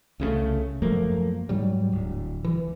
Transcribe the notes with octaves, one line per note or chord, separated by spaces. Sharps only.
C2 C#3 G3 A3
F#2 F3 A3 A#3
G#2 F#3 G3
D1
E3